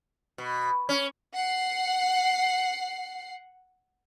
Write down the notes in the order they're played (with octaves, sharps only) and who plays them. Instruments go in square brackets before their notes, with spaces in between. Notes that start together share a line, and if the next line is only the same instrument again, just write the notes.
[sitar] B2
C#4
[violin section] F#5 C7